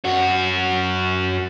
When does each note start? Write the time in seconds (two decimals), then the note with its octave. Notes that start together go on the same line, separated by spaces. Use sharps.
0.05 F#2 F#4